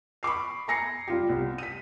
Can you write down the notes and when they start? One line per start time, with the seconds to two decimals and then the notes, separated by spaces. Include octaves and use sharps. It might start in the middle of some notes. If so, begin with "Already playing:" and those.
0.23 B5 C#6 D6 C7
0.68 G#5 A#5 A#6 C7 C#7
1.08 G3 F4 G4
1.29 C2
1.58 B6 D#7